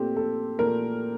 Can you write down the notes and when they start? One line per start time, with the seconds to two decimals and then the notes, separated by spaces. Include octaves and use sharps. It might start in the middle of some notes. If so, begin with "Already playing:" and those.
Already playing: A#2 A3 C4 G4
0.17 A4
0.59 A#2 A3 A#4